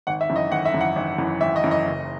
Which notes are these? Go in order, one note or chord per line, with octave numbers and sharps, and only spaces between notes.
G#1 F#5
E5
F#2 E3
D#5
G#1 F#5
E5
F#2 E3
F#5
G#1
F#2 E3
G#1 E5
D#5
F#2 E3
D#5
F#1